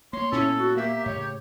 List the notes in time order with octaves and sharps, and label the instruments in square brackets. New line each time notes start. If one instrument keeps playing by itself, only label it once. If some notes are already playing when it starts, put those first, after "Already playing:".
[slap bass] A#3 [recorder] C#5 [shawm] C6
[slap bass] A#2 B3 [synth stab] C#4 E4 [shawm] A4
[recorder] F#4
[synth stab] A#3 [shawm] G4 [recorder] E5
[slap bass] A2 C#3 [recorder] C#5